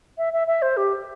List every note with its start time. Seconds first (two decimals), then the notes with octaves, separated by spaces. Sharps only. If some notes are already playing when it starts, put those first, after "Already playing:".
0.18 E5
0.33 E5
0.47 E5
0.62 C5
0.77 G4